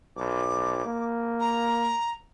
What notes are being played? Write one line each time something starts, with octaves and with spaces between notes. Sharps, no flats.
B1 D6
A#3
A#5